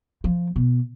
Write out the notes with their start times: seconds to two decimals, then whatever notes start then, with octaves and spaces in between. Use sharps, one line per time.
0.24 F3
0.56 B2